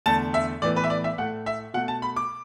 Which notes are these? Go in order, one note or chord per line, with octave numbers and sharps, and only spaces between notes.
E2 D3 A3 A5
E5
A2 E3 B3 D5
B4
E5
D5
E5
A2 A3 F#5
E5
B2 A3 F#5
A5
B5
D6